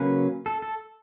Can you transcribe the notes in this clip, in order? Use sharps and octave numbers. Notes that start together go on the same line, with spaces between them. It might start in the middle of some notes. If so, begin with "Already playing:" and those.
Already playing: C#3 F#3 A#3 C#4 B4
A4
A4